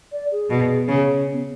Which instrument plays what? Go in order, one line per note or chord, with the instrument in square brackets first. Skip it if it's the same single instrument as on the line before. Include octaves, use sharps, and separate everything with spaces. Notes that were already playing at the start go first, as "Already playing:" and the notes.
[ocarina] D5
G#4
[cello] B2
C#3
[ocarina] C#4
B3